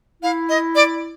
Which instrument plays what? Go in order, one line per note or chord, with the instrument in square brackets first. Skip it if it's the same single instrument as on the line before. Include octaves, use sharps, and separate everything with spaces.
[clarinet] E4 [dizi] F5
[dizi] D#5
D5